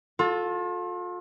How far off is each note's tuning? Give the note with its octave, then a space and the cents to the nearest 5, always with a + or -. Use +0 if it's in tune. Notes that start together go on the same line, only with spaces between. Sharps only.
F4 +35 A4 -5